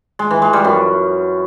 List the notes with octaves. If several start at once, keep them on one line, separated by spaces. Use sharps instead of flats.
G#3
E3
G#3
G3
F#2